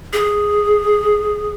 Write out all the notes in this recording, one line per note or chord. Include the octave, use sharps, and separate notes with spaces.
G#4